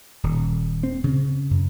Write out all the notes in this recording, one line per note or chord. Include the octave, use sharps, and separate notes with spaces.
D#1
C4
C#3
F#2